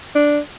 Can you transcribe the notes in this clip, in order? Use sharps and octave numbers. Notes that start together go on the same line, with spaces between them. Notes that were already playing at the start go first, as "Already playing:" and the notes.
D4